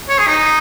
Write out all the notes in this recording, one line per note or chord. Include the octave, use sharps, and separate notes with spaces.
C#5
G#4
D#4